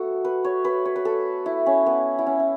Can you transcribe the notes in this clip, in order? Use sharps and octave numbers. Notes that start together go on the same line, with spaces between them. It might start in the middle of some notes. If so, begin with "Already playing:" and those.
Already playing: A3 B3 F#4 A4
B4
C#5
B4
C#5
B4
A4
E4
C#4
B3
E4
C#4
E4